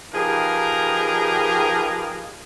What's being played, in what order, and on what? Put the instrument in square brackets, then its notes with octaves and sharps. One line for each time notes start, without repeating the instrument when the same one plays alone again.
[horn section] F3 D#4 G4 G#4 A#4 B4